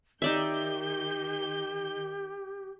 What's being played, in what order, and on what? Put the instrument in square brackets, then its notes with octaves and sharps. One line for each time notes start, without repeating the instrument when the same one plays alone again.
[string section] D#3 G6 [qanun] D#4 D5 E5 [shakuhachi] G4